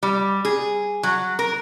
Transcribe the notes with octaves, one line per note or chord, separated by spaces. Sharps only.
G3
G#4
F#3
A#4